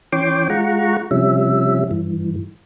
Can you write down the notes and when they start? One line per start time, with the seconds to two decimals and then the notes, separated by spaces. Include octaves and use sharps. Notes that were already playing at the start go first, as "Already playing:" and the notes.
0.12 E3 C#4 C#5 G5 C6 D6
0.50 G#3 F4 F#5 A#5 C#6
1.11 C3 F3 G3 C#4 E5
1.91 G2 E3